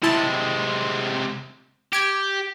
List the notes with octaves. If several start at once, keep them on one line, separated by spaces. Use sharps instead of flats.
C3 G#3 E4 A5
G4 G#6 D7